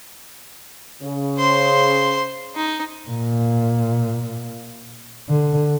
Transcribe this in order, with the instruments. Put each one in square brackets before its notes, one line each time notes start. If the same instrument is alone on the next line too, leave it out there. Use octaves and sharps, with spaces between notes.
[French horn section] C#3
[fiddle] C5 C6
D#4
[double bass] A#2
D3